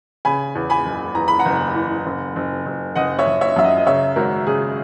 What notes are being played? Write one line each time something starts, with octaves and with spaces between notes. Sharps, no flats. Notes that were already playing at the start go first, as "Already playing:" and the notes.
C#3 G#5 B5
E2
G#5 B5
F#1
E2 A#5
B5
F#5 A#5
F#1
E3
F#1
F#1
F#1
F#1 D#5 F#5
C#5 E5
F#1
C#5 E5
F#2 E5
D#5 F#5
D#5
C#3 C#5 E5
G#1 F#4 A#4
C#3 G#4